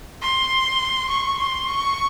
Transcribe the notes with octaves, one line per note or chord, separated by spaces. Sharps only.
C6
C#6
C6
C#6